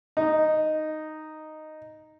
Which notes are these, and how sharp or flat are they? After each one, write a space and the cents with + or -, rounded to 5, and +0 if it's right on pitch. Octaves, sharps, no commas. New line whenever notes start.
D#4 -5